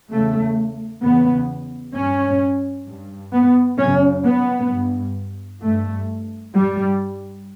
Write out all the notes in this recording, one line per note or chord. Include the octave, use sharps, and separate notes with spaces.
E2 C#3 A3
E2 C#3 B3
G2 C#4
G2
B3
F#2 C#3 C#4
B3
G2
G2 A3
G2 G3